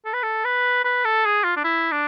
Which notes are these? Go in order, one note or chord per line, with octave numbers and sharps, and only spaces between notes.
A4
B4
A4
B4
B4
A4
G#4
F4
D4
E4
D4